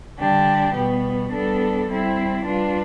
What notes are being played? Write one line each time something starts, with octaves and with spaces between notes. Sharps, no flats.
D3 G3 D4 G4
B2 G3 B3
G3 B3 D4 A4
G3 C4 E4
G3 D4 F4 B4